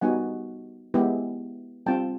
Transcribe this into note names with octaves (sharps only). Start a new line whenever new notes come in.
G3 B3 D#4 F#4 F#5 G#5
G#3 B3 E4 G4
G3 C4 F4 G5 A5